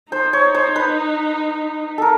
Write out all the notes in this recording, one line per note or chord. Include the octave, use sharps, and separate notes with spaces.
D#4 C5
C#5
C5
B4
A4 A#4